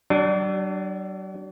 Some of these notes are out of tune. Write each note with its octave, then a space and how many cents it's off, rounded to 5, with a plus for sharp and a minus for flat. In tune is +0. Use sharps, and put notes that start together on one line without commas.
F#3 +45 D4 +10